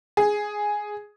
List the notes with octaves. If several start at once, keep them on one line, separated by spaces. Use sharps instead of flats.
G#4